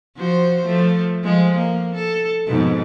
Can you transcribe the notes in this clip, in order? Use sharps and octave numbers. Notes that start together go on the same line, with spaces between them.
F3 F#4 C5
F3 A3
F3 G#3
A#3
A4
F2 G#2 B2